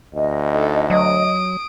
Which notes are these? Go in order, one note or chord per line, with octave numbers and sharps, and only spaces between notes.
D2 D#5
D#4 A4
F#3 D#6 D7